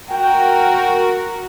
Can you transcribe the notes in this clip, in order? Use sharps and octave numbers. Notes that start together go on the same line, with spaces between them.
F#4 A#4 G5